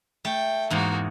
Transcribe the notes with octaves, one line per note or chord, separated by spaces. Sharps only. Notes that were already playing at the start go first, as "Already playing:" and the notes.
A3 G5
E2 G#2 A#3 F#4